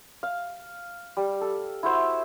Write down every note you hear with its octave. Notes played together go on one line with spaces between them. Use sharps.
F5
G3
A4
E4 F#4 C5 E5